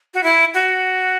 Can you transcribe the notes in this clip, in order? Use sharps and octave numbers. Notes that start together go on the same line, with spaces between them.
F#4
E4
F#4